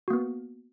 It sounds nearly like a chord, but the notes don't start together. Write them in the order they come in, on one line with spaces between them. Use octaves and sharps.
F#4 A#3 B3